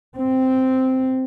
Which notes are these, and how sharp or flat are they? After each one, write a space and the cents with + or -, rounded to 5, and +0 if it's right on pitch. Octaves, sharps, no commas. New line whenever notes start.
C4 -5